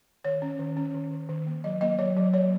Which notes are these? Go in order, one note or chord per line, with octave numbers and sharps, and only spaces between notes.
D#3 C#5
C#4
D#3
C#4
D#3
D#3
D#3
A#3
F#3 D#5
A#3 D#5
F#3 C#5
F#3
F#3 C#5